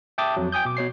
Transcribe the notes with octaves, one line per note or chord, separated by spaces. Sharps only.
E5 G5 A5 D6 D#6
F2 F#3
G5 G#5 D#6 G6
B2 D6
B2 C#5 C7